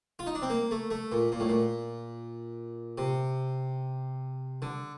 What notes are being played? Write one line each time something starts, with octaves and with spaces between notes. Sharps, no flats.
F4
D#4
D4
C4
A#3
A3
A3
A#2
A#2
A2
A#2
C3
D3